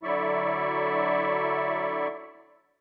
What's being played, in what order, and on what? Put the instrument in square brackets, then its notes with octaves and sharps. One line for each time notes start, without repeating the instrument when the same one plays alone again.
[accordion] D3 F#3 E4 D5 E5 C#6